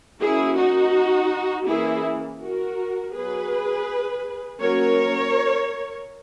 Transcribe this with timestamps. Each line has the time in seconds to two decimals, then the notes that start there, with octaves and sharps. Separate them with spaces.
0.21 F#3 A#3 C#4 E4 G#4
0.58 D#4 F#4
1.67 E3 A#3 C#4 E4 G#4
2.41 F#4 A#4
3.14 F#3 B3 G#4 B4
4.60 F#3 A#3 C#4 A#4 C#5